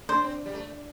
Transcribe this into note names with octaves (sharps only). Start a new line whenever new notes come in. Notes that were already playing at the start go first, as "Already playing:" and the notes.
D4 C5
C4
G3
A3